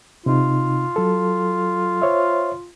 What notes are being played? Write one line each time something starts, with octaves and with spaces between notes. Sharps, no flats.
C3 D#4 F4
F#3 A4
C5 C#5 E5